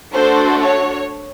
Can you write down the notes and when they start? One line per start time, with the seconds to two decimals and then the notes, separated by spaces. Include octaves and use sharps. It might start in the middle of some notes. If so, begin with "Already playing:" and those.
0.14 A3 D4 F#4 A4 C5
0.63 C#5